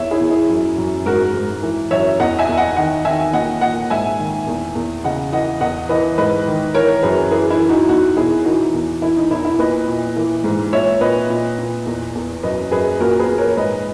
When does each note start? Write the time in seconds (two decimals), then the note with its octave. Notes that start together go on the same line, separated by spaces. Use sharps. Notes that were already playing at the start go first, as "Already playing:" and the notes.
Already playing: E2 E3 C#5 E5
0.11 E4 G#4
0.20 E2
0.30 E4 G#4
0.49 F#2
0.78 F#2
1.06 G#2 F#4 A#4
1.34 G#2
1.63 E3
1.91 F#2 C#5 E5
2.19 E2 D#5 F#5
2.39 E5 G#5
2.48 E2
2.58 D#5 F#5
2.76 D#3 D#5 F#5
3.05 D#3 E5 G#5
3.33 A#2 D#5 F#5
3.61 A#2 D#5 F#5
3.90 G#2 E5 G#5
4.19 D#3
4.47 E2
4.75 E2
5.04 C#3 D#5 F#5
5.33 E3 D#5 F#5
5.61 E2 D#5 F#5
5.89 E3 B4 D#5
6.18 G#2 B4 D#5
6.46 D#3
6.74 E3 A#4 C#5
7.03 F#2 G#4 B4
7.31 E3 G#4 B4
7.50 E4
7.60 E3
7.69 D#4 F#4
7.88 E2 D#4 F#4
8.17 B2 E4 G#4
8.45 E3 D#4 F#4
8.74 E2
9.02 E3 E4
9.16 D#4
9.30 E2 E4
9.45 E4
9.59 A#2 B4 D#5
9.88 A#2
10.16 E3
10.44 G#2
10.73 A#2 C#5 E5
11.01 A#2 B4 D#5
11.30 A#2
11.58 A#2
11.86 E2
12.15 E2
12.43 F#2 B4 D#5
12.71 F#2 G#4 B4
13.00 A#2 F#4 A#4
13.19 G#4 B4
13.28 A#2
13.38 A#4 C#5
13.57 G#2 B4 D#5